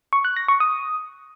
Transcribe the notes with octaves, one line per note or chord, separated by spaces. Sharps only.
C#6
F#6
A#6
C#6
D#6